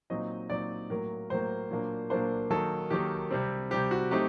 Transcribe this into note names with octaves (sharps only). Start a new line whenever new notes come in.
A#2 F#3 C4 D#4 D#5
A#2 F#3 C4 D#4 D5
A2 F#3 A#3 A#4
A2 F#3 A#3 C5
A#2 F#3 A#3 D4
A#2 F#3 A#3 D4 C5
D#3 F#3 A#3 D#4 A4
D#3 F#3 A#3 D#4 G4
C3 G3 C4
C3 G3 C4 G4
F#4
F#3 A3 C4 D#4 G4